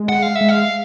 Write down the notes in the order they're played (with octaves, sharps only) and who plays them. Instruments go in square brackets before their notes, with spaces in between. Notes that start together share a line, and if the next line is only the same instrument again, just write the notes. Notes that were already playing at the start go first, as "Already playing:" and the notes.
Already playing: [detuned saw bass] G#3
[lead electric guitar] F#5
F5
E5
[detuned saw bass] G#3
[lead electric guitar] F5